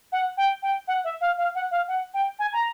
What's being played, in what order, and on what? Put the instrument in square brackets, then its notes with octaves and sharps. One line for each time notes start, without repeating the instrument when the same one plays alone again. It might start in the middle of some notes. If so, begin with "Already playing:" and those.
[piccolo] F#5
G5
G5
F#5
E5
F5
F5
F#5
F5
F#5
G5
G#5
A#5